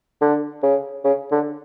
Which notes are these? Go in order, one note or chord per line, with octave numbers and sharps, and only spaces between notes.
D3
C#3
C#3
D3